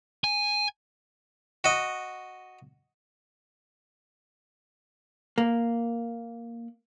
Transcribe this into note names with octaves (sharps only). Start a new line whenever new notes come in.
G#5
F#4 D#5
A#3